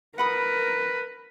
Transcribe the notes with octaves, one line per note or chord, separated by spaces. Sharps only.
A#4 B4 F#5 B5 D#6